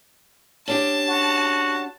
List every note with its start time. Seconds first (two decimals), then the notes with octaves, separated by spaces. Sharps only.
0.68 C#4 D4 G4 A5
1.08 F#4